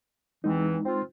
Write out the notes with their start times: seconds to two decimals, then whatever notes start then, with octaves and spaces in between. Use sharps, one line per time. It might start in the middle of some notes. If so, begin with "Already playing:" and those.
0.44 E2 E3 G#3 C4 D#4
0.85 C4 F4